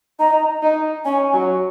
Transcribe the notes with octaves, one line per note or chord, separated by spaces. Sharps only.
D#4 A#5
D#4
C#4 G#5
F#3